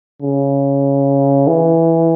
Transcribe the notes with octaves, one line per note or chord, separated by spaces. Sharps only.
C#3
E3